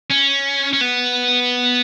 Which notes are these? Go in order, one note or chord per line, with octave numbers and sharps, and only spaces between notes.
C#4
C#4
B3